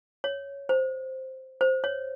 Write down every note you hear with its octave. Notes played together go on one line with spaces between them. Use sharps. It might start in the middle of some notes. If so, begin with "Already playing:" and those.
C#5
C5
C5
C#5